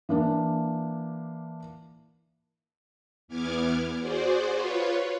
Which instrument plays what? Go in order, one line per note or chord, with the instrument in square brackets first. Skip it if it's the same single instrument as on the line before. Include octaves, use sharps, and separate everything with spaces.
[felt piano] E3 A#3 D4
[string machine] E2 E3 B3 D6 F6 G#6
F#4 G#4 C5 D5
F4 B4 C#5